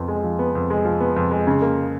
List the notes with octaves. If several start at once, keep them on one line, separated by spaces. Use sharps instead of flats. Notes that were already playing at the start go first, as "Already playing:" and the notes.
Already playing: F2 F3 B3
G#3
F3
B3
F2
G#3
F3
B3
F2
G#3
C#3
A#3